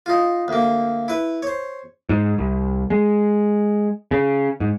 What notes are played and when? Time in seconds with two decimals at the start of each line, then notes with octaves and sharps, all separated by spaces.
0.06 D#4 F4
0.48 D2 A#3
1.08 E4 B4
1.42 C5 C#5
2.09 G#2
2.38 C2
2.90 G#3
4.11 C#3
4.60 G#2